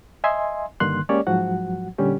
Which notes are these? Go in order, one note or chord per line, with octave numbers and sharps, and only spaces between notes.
D#5 E5 G#5 C6
G2 D3 D#3 A#3 C6 F#6
G#3 A#3 C#4 G4 C#5 D5
G#2 F3 F#3 F#4 F#5
A#2 D3 G3 C#4 G4